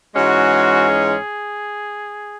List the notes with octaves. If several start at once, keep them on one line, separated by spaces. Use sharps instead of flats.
G#2 E3 G#3 C#4 F#4
G#4